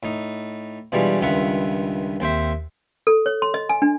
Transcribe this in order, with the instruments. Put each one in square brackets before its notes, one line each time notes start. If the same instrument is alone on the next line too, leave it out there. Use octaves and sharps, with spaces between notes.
[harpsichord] A2 D#4
B2 E3 G3 G#3 D4 F4
C#2 G2 D#3 F4 E5 F#5
D#2 C4 C5 E5
[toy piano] A4
C#5
C6
D#5
G#5
D4